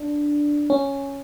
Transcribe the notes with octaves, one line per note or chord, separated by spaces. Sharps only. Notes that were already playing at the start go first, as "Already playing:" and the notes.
Already playing: D4
C#4